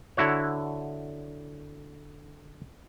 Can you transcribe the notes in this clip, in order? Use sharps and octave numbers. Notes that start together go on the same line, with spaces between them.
D3 E4 F#4 C#5